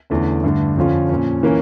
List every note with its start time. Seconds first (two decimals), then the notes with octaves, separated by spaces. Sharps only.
0.10 E2 D3 A3 C#4
0.44 G2 D3 A3
0.77 F2 D3 F3 C#4 F4
1.09 A#2 F3 C#4
1.43 E3 A#3 C#4